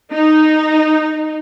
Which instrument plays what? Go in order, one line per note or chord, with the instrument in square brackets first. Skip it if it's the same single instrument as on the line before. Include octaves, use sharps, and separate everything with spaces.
[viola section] D#4